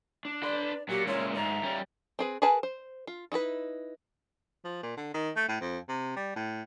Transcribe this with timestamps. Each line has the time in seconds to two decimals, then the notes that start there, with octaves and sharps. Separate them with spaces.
0.25 D4
0.44 B4 D5 C6
0.89 A#2 F#3 G4
1.07 G#3 C#4 E4 C#5
1.36 G#2 D5 E5 F5 A#5
1.63 G3 C#4
2.19 C4 G#4 B4
2.42 G#4 A#4 B4 G#5 A5
2.63 C5
3.07 F4
3.32 D#4 E4 F#4 B4
4.65 F3
4.83 A#2
4.97 D3
5.15 D#3
5.36 A3
5.49 A2
5.61 F2
5.89 C3
6.16 G3
6.36 A2